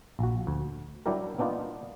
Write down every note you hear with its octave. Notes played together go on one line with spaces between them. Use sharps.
A#1 F#4
D2
F#3 G3 D4 E4 G4 A#4
A#3 B3 D4 D#4 F4